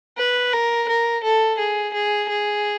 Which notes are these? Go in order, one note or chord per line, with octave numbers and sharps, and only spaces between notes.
B4
A#4
A#4
A4
G#4
G#4
G#4